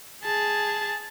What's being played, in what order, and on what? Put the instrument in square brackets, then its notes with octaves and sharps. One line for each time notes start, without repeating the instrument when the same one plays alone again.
[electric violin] G#4 A5